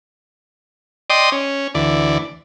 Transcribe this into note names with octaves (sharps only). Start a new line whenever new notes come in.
D5 D#5 G5 C6 D#6
C#4
D2 E3 D5